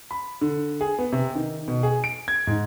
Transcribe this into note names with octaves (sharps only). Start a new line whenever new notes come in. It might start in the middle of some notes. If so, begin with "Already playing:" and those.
B5
D3
G#4
B3
C3
D#3
B2
G#4
D7
G#6
G#2